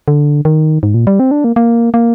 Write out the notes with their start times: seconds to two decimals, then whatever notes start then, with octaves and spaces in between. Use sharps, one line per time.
0.08 D3
0.45 D#3
0.83 G#2
0.94 A#2
1.07 G3
1.20 C4
1.31 D4
1.44 A#3
1.56 A#3
1.94 A#3